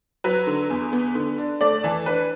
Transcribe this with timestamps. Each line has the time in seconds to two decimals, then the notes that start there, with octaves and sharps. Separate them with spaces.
0.24 F#3 B4
0.47 D3
0.70 E2
0.93 B3
1.15 D3
1.38 D4
1.61 A3 D5
1.84 E3 A5
2.06 D4 B4